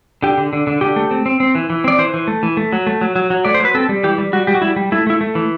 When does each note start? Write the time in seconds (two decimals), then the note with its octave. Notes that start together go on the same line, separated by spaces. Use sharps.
0.22 D3 G4
0.37 D3
0.53 D3
0.67 D3
0.81 D3 G4
0.96 A3
1.11 C4
1.26 C4
1.40 C4
1.55 E3
1.70 E3
1.84 C4 D5
1.98 E3 C5
2.14 E3
2.28 A3
2.43 E3
2.57 A3
2.72 F#3
2.87 A3
3.01 F#3
3.16 F#3
3.30 F#3
3.45 A3 D5
3.54 C5
3.60 F#3
3.65 B4
3.75 C4 A4
3.89 G3
4.03 E3 G4
4.18 G3
4.33 G3 F#4
4.47 G3 G4
4.54 F#4
4.62 G3 E4
4.76 G3
4.92 A3 E4
5.07 A3 E4
5.21 A3
5.35 E3